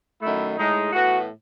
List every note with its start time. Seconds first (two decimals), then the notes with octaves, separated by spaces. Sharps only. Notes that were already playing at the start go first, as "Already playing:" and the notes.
0.21 F#2 D#3 A3 E4
0.58 A2 G#3 D#4
0.93 A2 E3 B3 F#4